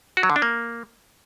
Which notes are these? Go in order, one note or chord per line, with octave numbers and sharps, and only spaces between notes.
F#4
F#3
D3
D4
A#3